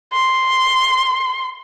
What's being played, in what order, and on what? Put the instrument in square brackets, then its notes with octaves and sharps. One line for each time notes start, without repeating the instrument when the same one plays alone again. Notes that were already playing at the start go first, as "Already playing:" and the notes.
[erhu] C6